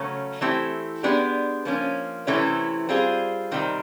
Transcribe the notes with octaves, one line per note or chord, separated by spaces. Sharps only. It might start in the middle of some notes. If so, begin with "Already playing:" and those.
Already playing: C#3 F#3 A3 C#4
E3 A3 C4 E4 G4
G#3 B3 D4 G4
F3 A#3 C#4
C3 E3 A3 C#4 E4
G3 C4 F4 G#4
C3 D#3 G3 C4